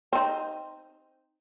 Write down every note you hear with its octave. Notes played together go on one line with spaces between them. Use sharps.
C4 D#4